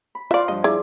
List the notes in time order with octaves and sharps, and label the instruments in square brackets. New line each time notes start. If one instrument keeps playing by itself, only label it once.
[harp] B5
[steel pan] F4 [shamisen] D5 E5
[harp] G2 F3 [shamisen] D#5
[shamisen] E4 [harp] G#4 [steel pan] D5